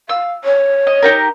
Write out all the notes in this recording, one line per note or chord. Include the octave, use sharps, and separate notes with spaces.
F5 E6
C#5
D#5
D#4 G4 A#4